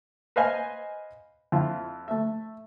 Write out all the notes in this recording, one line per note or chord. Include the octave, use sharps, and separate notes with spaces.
B4 C5 D#5 F5 G#5 B5
F2 E4 F4
A3 E5